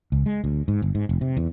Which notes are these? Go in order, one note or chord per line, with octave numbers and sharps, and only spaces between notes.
C#2
G#3
D2
G#2
G1
G#2
F1
C3
E2